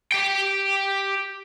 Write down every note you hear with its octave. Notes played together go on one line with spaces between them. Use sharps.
G4 G5